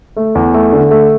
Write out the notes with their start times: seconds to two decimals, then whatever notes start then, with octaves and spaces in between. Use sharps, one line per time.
0.17 A3
0.35 E2
0.54 A3
0.72 D3
0.91 A3